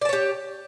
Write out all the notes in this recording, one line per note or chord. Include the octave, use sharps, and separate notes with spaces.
G4 C#5 D5 A5